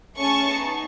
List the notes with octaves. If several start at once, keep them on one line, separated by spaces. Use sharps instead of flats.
A3 C#4 G#4 A5 C#6
B3 D#4 G#4